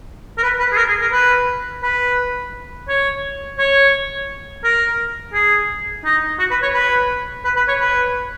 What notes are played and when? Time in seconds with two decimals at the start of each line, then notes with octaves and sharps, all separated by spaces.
0.38 A#4
0.43 B4
0.60 B4
0.72 G#4
0.77 A#4
0.89 G#4
1.02 A#4
1.12 B4
1.83 B4
2.89 C#5
3.59 C#5
4.64 A#4
5.34 G#4
6.05 D#4
6.39 F#4
6.51 B4
6.63 C#5
6.74 B4
7.45 B4
7.56 B4
7.68 C#5
7.80 B4